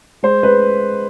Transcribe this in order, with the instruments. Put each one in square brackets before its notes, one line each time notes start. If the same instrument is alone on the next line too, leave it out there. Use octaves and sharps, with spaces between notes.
[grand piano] G#3 C5
G#3 B4